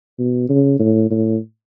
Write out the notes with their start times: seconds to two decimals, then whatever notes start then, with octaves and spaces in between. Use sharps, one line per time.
0.19 B2
0.50 C#3
0.80 A2
1.11 A2